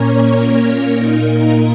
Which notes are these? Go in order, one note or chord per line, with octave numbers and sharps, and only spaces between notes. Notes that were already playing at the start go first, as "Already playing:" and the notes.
Already playing: A#2 A#3 C#4 A#4 C#5
A#4
A#2 A#3 D#4